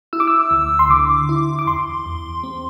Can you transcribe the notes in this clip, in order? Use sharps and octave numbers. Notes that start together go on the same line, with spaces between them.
E4 E6
D6
E6
D2
C6
D3 D6
E4
D6
E2 C6
E2
C4